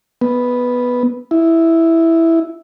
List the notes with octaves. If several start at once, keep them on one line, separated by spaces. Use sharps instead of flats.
B3
E4